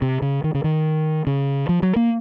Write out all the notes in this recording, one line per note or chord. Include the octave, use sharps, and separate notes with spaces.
C3
C#3
D#3
C#3
D#3
C#3
F3
F#3
A#3